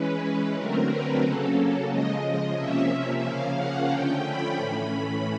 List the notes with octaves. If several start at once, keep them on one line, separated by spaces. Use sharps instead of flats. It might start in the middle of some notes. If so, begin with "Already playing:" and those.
Already playing: E3 G#3 C#4 B4
D3 F#3 A3 C4 A#4
B4
C#3 F#3 A#3 C#4 A4
C#3 F3 G#3 D#5
C3 F3 A#3 C#4 E5
C#3 F3 A#3 C#4 F5
F#5
D3 F3 A3 C#4 G5
B5
A2 E3 A3 C#4